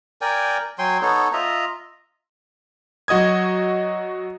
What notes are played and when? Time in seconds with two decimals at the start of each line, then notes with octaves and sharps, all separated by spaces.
0.21 A#4 D5 G5 G#5
0.79 F#3 G5 G#5 C6
1.02 B3 D#4 A4 C#5
1.33 F4 D#5 E5 A#5
3.08 F#3 F#4 D#5 D#6 G#6